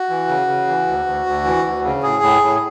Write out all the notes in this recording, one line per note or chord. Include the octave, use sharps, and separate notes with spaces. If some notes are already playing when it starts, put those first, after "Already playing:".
Already playing: F#4
E3
C#3
C#3
E3
D2
D2
D2
E3
D2
C#3
A2 G#4
A2
A2